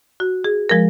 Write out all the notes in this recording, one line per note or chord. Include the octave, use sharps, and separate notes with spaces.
F#4
G#4
F3 G#3 A#4